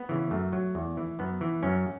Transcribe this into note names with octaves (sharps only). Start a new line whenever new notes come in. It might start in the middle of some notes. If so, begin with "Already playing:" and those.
Already playing: B3
C#3 E3
F#2 A3
F#3
E2
E3
F#2 B3
E3
F#2 C#4